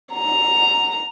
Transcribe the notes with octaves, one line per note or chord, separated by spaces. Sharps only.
A#5